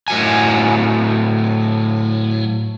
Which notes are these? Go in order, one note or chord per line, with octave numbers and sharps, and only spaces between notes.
A2 F#3 G#5